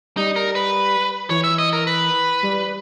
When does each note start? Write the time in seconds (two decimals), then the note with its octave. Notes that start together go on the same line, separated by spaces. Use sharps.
0.17 G3 D#4
0.36 A#4
0.55 B4
1.30 E3 C#5
1.44 E5
1.58 D#5
1.73 A#4
1.87 B4
2.43 G3